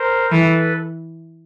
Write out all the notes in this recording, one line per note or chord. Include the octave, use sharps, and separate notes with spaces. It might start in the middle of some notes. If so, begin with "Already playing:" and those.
Already playing: A#4 C5
E3 A4 B4